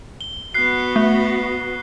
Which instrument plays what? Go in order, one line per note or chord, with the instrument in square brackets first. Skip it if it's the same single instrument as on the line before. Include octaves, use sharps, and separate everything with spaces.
[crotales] G7
[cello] B3 F#4 [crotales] F#6 C7
[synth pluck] A3